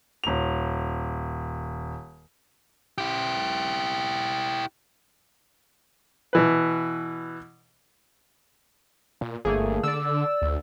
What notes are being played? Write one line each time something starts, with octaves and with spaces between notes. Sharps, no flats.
D#1 F7
E4 G4
B2 E3 B4
A#2
G1 A3 A#3 G#4
D3 D5 E6
D2